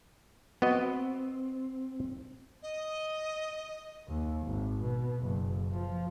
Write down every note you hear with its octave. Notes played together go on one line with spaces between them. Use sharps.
B3 C4 F#4 D#5
D#5
D#2
G#1
B2
F#1
F3